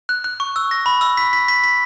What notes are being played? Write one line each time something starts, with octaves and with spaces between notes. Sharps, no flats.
F#6
F#6
C#6
E6
A#6
B5
E6
B6
B6
B6
B6